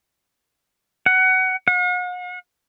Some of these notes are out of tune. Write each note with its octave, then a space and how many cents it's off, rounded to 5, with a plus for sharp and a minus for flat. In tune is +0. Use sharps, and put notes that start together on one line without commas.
F#5 +20
F#5 -45